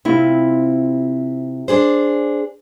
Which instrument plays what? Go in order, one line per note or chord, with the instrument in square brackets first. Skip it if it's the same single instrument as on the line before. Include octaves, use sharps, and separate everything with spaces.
[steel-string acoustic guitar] C3 [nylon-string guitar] C4 E4 F4
[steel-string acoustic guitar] D4 G#4 C5